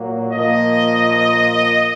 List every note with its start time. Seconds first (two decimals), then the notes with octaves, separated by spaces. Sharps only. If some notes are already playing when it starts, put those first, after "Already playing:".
Already playing: A#2 F#3 A#3
0.33 A#2 F3 A#3 D#5